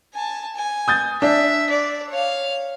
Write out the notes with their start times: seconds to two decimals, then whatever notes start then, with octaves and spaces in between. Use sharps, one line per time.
0.14 G#5 A5
0.56 G#5
0.88 D#6 G6 A6
1.22 D4 E5
1.70 D5
2.10 C#5 F5